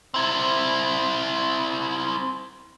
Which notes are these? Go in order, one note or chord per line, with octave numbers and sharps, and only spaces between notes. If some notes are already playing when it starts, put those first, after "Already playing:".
C4 E4